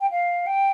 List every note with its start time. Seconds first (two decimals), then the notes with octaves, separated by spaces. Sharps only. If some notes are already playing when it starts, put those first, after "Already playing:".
0.01 G5
0.11 F5
0.47 G5